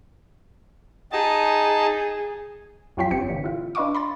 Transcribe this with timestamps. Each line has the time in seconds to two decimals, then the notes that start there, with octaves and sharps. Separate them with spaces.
1.12 D#4 G#4 A5
2.97 F2 F#3 F4 C#5 G5 B6
3.11 G1 C4 G4 C#7
3.28 A#2 D3 E3
3.44 E4 F4
3.75 D4 B4 D#5 F5 C#6 D6
3.95 B5 C6 A6